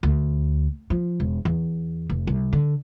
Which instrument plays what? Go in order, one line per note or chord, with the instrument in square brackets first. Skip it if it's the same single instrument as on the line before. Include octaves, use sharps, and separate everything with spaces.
[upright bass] D2
F3
E1
E2
F1
C2
D3